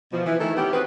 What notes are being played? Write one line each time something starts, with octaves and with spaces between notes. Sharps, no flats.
B2 E3 F3
E3
D#3 A3 E4 A4
B3 C#4 G4
C4 F#4 G#4 B4